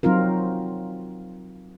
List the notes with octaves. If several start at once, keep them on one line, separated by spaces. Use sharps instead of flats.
F#3 C4 D#4 F4 A#4